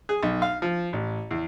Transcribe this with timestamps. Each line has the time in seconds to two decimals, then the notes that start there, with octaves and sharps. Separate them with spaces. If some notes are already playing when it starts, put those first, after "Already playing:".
0.09 G#4
0.23 B1
0.42 F5
0.62 F3
0.93 A1
1.31 E2